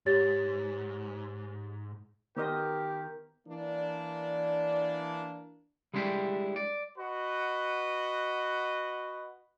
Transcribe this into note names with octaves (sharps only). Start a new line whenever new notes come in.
G#2 G4 C#5 A6
D#3 B3 G4 A#4 C5 D#5
E3 A#3 D4
G3 G#3 D4 E4 F4 G4
D5
F#4 B4 D#5